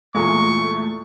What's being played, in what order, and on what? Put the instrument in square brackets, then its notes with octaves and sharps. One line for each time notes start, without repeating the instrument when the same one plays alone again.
[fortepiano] E2 A#2 G#3 [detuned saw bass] A3 [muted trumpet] C#6